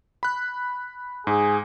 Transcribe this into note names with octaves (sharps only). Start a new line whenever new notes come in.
B5 F#6
G#2 G#4